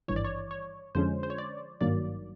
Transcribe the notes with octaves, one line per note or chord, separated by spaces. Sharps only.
G#1 G2 E3 C#5
D5
C#5
C#5
F2 D3 F3 G#3 C#4 C5
C5
C#5
D5
G#1 G2 D#3 F#3 A#3 D5